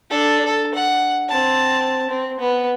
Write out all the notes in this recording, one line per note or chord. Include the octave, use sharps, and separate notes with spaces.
D4 A4
A4
F#5
C4 A5
C4
B3